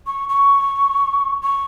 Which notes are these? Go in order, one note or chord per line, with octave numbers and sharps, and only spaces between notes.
C#6
C#6
C#6